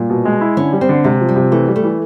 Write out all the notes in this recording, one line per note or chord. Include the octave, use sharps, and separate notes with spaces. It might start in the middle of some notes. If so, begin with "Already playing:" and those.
Already playing: A#2 G3
B2
G#3
E4
D3 C#4
G3
C4
D3
C3 G#3
F3
G3
C3
E3 A3
G3
A3
E3